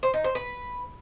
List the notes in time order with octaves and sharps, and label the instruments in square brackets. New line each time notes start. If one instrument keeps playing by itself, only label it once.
[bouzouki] C5
D#4
C5
B4